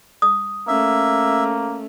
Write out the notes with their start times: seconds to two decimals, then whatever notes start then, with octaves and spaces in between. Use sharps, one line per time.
0.22 D#6
0.68 A3 A#3 C#4 E5